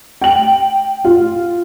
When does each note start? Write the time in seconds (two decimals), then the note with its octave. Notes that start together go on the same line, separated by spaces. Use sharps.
0.22 G5 F#7
1.05 F4